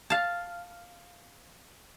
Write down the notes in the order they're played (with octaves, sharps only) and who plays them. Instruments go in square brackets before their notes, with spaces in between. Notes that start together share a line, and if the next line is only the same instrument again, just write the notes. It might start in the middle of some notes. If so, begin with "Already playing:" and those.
[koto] F5 A5